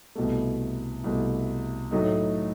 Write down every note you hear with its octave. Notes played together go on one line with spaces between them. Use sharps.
C2 B2 A3
C2 B2 A3
A2 F#3 A3 D#4